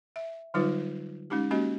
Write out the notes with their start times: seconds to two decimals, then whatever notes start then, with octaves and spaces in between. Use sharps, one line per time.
0.16 E5
0.54 D3 F#3 G3 D#4 F4 B4
1.30 G#3 C#4 D#4 G4
1.51 G#3 A#3 C#4 F#4 G4 D#5